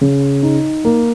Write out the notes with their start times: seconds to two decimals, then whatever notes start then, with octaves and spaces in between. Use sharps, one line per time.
0.01 C#3
0.43 D#4
0.85 A#3